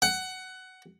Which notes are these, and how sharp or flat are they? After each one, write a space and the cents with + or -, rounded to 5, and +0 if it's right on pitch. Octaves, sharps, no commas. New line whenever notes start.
F#5 +15